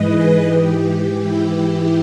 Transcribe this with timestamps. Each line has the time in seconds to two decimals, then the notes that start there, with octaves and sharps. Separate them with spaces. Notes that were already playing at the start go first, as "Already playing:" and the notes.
Already playing: G#2 E3 B4 D#5
0.08 G#4
0.45 G#2 E3 G4
1.16 E4